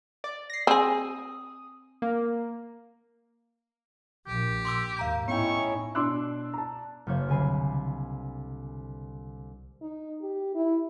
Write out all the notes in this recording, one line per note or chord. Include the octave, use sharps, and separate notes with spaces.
D5
A#6 C7
C4 G#4 D#6
A#3
A#1 A#2 G4
C6 D6 E6
D#2 G#2 F5 A#5 G6
A2 B3 C#4 D#4 E4 C#5 G5 C#6
B2 D4 C6 D6 E6 F#6
A5 A#5
F#1 A#3 C5 C#5
C2 D3 G#5 B5 C7
D#4
G4
E4